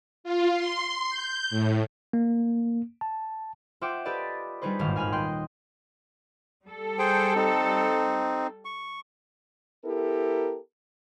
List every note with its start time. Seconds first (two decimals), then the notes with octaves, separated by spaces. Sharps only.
0.24 F4
0.54 C6
1.10 G6
1.50 A2
2.13 A#3
3.01 A5
3.81 F4 C5 E5 F#5 G5 D6
4.05 G4 A4 B4 D5 D#5
4.62 G3 D4 D#4 G#4 B4 C5
4.79 D#1 G#1 G2 D#3 F5
4.96 F5 G#5 B5 F6
5.12 D#5 G5 C6 F#6
6.65 G3 A4
6.99 G#4 C5 G5
7.35 C4 D#4
8.65 C#6
9.85 B3 E4 G4 A4 A#4